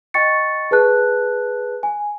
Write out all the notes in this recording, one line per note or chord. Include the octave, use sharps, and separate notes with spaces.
D#5 G5 C#6 A6 C#7
G#4 B4 A5 F#6
G#5